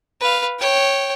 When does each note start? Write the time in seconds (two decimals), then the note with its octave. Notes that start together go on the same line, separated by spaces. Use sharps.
0.20 B4 F5
0.59 C#5 G5